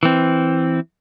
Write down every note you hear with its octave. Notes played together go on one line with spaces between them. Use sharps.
E3 C4